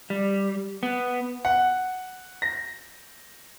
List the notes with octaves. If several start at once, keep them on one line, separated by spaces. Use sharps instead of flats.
G3
B3
F#5
A#6